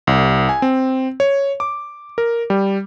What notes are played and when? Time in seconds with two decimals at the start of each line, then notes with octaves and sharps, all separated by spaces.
0.07 C2
0.49 G#5
0.62 C4
1.20 C#5
1.60 D6
2.18 A#4
2.50 G3